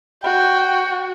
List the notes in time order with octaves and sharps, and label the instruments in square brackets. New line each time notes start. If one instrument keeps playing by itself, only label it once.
[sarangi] F#4 [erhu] G5